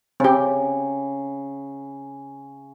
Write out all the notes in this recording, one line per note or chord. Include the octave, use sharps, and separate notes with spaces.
C#3 C4 G4